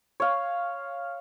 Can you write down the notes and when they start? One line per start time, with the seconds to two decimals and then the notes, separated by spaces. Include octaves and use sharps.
0.20 C#5 F5